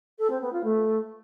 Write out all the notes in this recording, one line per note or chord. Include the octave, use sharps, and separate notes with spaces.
A4
C4
B3
F4
A3